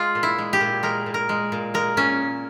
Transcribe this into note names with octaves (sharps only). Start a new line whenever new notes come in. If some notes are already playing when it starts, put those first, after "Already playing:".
Already playing: G#3 F4
A#2
E4
G#3
G4
A#2
G#3 A#4
A#2
A#4
G#3
A#2
G#3 A#4
A#2 C#4